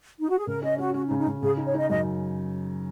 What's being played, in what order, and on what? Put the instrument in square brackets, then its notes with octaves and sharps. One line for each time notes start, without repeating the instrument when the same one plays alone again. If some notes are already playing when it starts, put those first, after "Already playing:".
[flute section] D#4
F#4
G#4
[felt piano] C#3 [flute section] A#4
[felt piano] C#4 [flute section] D#5
[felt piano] C#4 [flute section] F#4
[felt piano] C#4 [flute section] F#4
[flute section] D#4
[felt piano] C#3
[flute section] D#4
[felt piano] C#3
[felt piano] C#3 [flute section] G#4
[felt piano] D#4
[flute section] C#5
[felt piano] D#4 [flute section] D#5
[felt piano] F#2 [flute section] D#5